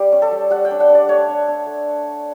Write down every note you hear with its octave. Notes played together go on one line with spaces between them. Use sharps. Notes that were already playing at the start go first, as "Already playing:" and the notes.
Already playing: G3 G4
C#4
A4
G3
G3 F#5
G5
D4
F#5
D4
D5
A3 C#5
D4
D4
A3